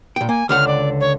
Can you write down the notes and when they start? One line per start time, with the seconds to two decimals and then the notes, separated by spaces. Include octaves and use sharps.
0.16 A#2 G5
0.29 A#3 G#5
0.49 C#2 D3 F#5 F6
0.67 D5
1.00 C#5